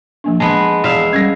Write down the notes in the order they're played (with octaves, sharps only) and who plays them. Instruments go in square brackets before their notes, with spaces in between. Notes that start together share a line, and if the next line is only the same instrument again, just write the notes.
[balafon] F3 A#3 D4
[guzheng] G#3 B3 [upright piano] A5
[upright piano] E2 [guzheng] E5 F5
[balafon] G3 C#4 [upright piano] G#6 A#6